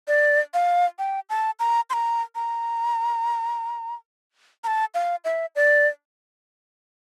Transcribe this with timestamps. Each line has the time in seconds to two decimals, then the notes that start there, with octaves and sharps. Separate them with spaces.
0.08 D5
0.54 F5
0.99 G5
1.30 A5
1.60 A#5
1.90 C6
1.93 A#5
2.35 A#5
4.64 A#5
4.67 A5
4.94 F5
5.25 E5
5.55 D5